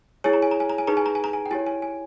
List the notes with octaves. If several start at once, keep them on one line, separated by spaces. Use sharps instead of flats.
E4 G#4 C#5 G#5
A#5
G#5
A#5
G#5
A#5
G#5
D#4 G#4 B4 A#5
G#5
A#5
G#5
A#5
G#5
G5
E4 G4 C#5 G#5
G#5
G#5